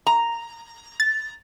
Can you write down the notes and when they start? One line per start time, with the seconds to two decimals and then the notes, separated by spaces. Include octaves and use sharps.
0.07 A#5
1.00 A6